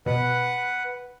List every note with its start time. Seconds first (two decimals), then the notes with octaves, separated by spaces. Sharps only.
0.06 B2 B4 F#5